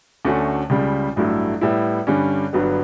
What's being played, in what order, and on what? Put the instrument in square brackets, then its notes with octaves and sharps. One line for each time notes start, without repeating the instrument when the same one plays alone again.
[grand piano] D2 D3 A3 C#4 F#4
C#2 C#3 G3
A1 G2 F#3 A3 E4
A2 G3 B3 E4
G2 D3 G3 C#4
G1 G2 F#3 B3